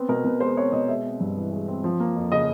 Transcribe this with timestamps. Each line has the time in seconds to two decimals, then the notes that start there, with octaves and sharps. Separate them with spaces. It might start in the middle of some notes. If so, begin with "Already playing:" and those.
Already playing: B3 C4
0.09 B2 A#4
0.24 B2 B4
0.40 G#3 C5
0.57 C4 C#5
0.73 B2 D#5
0.88 G#3 E5
1.05 C4
1.20 G2
1.36 E3
1.52 G#3
1.68 C4
1.84 F3
2.00 A#3
2.16 F2
2.32 C#3 D#5